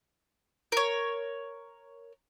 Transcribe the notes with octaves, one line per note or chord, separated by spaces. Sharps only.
A#4 C#5